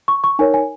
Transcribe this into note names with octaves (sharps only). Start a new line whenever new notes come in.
C#6
C#6
D#4 A#4 C#5 G#5
G#5